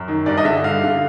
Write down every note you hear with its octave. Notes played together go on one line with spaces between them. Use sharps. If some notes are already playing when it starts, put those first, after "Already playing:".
Already playing: F#2
D#3
G2 D5
D#5
D3 E5
G2 F5
D3